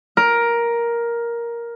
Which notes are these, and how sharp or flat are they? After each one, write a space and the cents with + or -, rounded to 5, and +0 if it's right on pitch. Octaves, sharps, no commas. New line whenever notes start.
A#4 +10